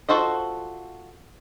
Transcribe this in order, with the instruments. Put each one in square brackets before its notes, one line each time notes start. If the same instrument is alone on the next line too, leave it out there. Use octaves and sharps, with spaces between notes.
[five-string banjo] F4 F#4 A4 C5 D#5